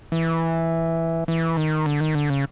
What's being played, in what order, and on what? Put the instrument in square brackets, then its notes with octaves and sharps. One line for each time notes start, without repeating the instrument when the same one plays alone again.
[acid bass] E3
E3
D#3
D3
D#3
D3
C#3